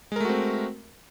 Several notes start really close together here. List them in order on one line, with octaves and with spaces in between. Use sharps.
G#3 A#4 A3 F#4 C4